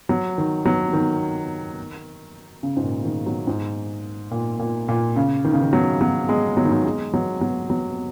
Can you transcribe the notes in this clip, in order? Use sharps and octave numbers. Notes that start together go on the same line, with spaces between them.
F#3
D#3
F#3
D#3
C#3
G#2
A#2
D#3
F#3
G#2
A#2
A#2
A#2
C#3
D#3
C#3
D#3
F#3
F#3
G#3
F#3
D#3
F#3
G#3
F#3
F#3
F#3